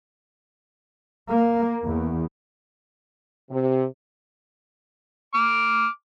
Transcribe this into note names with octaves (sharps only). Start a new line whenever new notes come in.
A#3
E2
C3
D6 F6